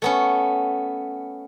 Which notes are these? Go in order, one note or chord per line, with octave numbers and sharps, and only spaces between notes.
A3 B3 C#4